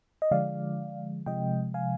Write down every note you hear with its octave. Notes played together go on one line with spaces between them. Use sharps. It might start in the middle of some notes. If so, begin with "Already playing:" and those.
D#5
D3 F3 G#3 D5 F5
C3 F3 G#3 D#5 G5
F5 G#5